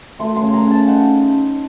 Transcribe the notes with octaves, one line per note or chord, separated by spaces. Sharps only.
A3 C6
C6
C#3
A#5
C#3
A5
D#4 F#5